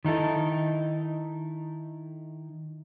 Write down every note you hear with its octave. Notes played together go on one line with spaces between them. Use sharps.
D#3 D#4 E4 A4